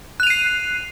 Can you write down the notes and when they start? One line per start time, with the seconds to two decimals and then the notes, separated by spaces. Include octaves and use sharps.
0.20 F#6
0.23 F7
0.27 D#7
0.30 C7